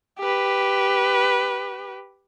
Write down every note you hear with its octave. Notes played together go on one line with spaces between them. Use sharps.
G4 B4